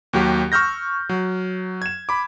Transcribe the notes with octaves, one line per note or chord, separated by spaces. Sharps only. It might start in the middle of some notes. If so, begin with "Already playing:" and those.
D#2 F#3 G4
C#6 E6 F6 G6 A#6
F#3
G#6 E7
B5 D6